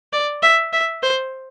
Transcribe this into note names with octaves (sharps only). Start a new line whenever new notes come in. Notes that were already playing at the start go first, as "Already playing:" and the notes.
D5
E5
E5
C5